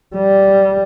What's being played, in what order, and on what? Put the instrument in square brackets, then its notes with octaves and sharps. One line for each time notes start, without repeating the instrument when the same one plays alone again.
[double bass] G3